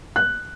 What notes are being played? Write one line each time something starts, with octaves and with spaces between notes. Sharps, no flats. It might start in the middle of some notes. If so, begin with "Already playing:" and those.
F#6